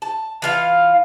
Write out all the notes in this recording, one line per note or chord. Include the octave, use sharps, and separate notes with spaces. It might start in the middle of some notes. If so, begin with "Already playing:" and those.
A5
E3 F4 F5